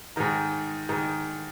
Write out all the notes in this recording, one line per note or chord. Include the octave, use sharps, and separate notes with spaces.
G#2 D#3 A#5
G#2 D#3 A#5